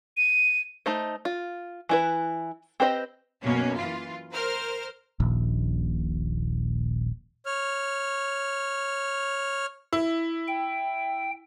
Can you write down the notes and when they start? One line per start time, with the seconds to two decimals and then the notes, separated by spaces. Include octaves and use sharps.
0.17 D#7
0.86 A3 D#4 C5
1.25 F4
1.89 E3 E4 B4
2.80 C4 G4 B4 C5 D#5
3.43 F#2 B2 A#3 C#4
3.76 E3 F4
4.33 A#4 C5 F6
5.20 D#1 A#1
7.46 C#5 F6
9.93 E4
10.48 G5